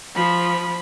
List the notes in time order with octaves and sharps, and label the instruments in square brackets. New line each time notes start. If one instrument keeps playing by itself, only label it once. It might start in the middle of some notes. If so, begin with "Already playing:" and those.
[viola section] F3 [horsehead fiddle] B5